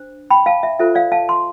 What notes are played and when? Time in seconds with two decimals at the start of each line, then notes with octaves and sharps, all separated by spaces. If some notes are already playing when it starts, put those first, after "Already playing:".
Already playing: D4 C5
0.31 G5 B5
0.46 F5 A5
0.63 E5
0.79 F4 A4 C5 E5
0.95 D5 F5
1.12 F5 A5
1.28 A5 C6